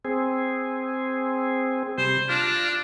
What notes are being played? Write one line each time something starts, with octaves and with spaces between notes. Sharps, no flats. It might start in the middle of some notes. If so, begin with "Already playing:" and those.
C4 G#4
C3 G3 C5
D4 F4 F6 A#6